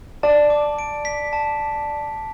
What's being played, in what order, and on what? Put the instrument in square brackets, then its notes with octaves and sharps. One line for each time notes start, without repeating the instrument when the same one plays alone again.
[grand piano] D5 [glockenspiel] A5
[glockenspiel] D6
D7
B6
A5